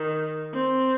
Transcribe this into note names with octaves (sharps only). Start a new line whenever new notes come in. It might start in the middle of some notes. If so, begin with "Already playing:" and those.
Already playing: D#3
C4